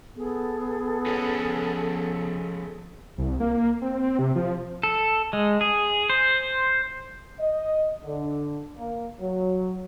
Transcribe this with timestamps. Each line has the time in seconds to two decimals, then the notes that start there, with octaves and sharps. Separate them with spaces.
0.15 B3 G#4 A4
1.06 F3 C#4
3.18 C2
3.40 A#3
3.82 C4
4.19 C3
4.36 F3
4.83 A4
5.33 G#3
5.61 G#4
6.10 C5
7.40 D#5
8.04 D3
8.78 A#3
9.20 F#3